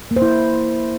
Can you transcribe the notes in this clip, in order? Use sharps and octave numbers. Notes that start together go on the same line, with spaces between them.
A#3
C5
E4